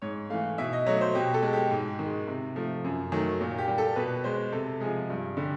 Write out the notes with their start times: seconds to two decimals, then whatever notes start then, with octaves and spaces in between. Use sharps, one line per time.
0.02 G#2 C#5
0.30 E3 A3 F5
0.58 B2 E5
0.73 D#5
0.86 F#3 A3 C#5
1.01 C5
1.15 B2 G4
1.34 A4
1.43 G#3
1.53 G4
1.71 G#2
1.99 D#3
2.04 G#3
2.27 C3
2.56 F3 A3
2.84 F#2
3.12 D#3 F#3 A3
3.41 A#2
3.58 G4
3.68 G3
3.78 A4
3.96 B2 B4
4.24 G#3 C5
4.52 C3 A4
4.80 F3 G#3 G#4
5.10 G2
5.37 D3 G3